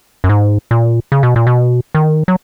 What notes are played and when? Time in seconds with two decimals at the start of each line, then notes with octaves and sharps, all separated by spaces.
0.24 F#2
0.29 G#2
0.71 A#2
1.12 C#3
1.23 B2
1.36 A#2
1.47 B2
1.95 D#3
2.28 F#3